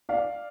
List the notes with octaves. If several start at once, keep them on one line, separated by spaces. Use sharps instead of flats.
D5 F5